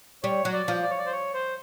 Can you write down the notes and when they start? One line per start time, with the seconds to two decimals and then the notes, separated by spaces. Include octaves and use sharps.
0.23 G3 C#5
0.45 F#3
0.53 D5
0.68 F3
0.82 D5
0.90 C#5
0.98 D5
1.06 C5
1.12 C#5
1.34 C5